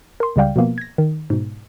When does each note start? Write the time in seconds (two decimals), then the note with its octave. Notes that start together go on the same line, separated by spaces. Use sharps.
0.20 A#4 C6
0.36 C#2 C#3 G3 D5 F5 G5
0.56 B2 F3 A#3 B3
0.78 G#6 A#6
0.98 D#3
1.30 G#2 B2